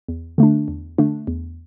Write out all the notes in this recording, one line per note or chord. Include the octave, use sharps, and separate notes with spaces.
E2
D3 A3 D4
E2
D3 A3 D4
E2